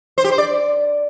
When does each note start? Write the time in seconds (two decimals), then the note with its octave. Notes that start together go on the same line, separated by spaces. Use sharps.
0.18 C5
0.24 G4
0.31 C5
0.38 D5